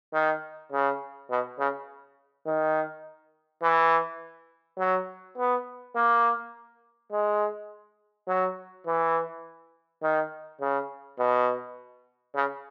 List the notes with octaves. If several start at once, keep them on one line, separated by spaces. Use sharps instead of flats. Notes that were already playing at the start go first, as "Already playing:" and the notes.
D#3
C#3
B2
C#3
D#3
E3
F#3
B3
A#3
G#3
F#3
E3
D#3
C#3
B2
C#3